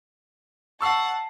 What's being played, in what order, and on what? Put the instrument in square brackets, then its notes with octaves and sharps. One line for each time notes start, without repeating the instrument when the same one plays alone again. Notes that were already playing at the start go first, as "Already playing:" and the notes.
[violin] F#5 A5 [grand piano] C#6 E6 C7